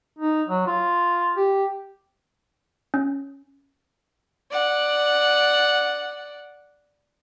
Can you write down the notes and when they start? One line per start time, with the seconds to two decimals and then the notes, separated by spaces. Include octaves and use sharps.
0.19 D#4
0.48 F#3
0.67 F4
1.37 G4
2.94 C#4
4.51 D5 F#5